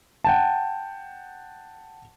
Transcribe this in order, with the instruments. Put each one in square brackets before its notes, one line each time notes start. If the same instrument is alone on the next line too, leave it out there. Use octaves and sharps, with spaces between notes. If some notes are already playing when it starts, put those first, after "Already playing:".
[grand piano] F#5 G5 A5